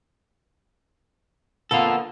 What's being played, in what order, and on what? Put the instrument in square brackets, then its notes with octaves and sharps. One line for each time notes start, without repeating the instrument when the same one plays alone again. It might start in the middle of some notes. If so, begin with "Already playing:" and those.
[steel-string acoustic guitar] D3 A#3 B3 [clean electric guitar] F4 A4